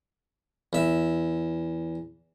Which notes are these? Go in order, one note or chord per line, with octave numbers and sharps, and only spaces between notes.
E2 E5